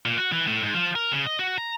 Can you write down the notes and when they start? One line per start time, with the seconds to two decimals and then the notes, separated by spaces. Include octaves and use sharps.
0.05 A#2
0.18 F#4
0.32 E3
0.47 A2
0.62 G#2
0.74 F3
0.95 A#4
1.12 C#3
1.26 D#5
1.39 F#4
1.58 A#5